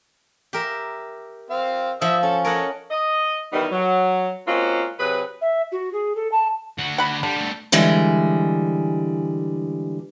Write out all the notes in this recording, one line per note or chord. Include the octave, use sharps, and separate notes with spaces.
G4 A#4 E5
C4 F5
F3 E5 D#6 E6
C#4 A4
A4 A#4 C#5 D#5 F#5
D#5
D#3 E3 G3 B3 D#4
F#3
G#3 A#3 C4 C#4 F4 F#4
C3 F#3 G#4 B4
E5
F#4
G#4
A4
A5
D3 F#4
F#5 B5
D3 G3
G3 A3
D3 E3 G3 G#3